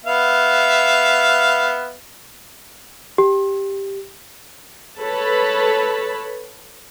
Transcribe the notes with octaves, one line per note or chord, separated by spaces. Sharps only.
B3 E5 F5
G4
A4 B4 C#5 A5 B5